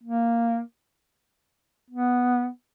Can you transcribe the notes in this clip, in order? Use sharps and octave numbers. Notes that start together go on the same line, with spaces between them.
A#3
B3